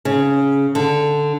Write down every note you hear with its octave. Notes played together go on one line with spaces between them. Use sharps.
C#3
D3